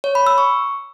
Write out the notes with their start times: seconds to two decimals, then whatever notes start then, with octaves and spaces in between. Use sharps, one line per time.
0.04 C#5
0.15 B5
0.27 E6
0.38 C#6